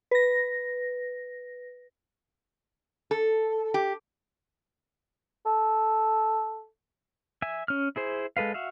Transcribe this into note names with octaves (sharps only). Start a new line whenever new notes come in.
B4 A#6
A4
G4
A4
E5 G#5
C#4 F6
E4 G#4 C5
G#3 A4 B4 F5
F#4 E5 F5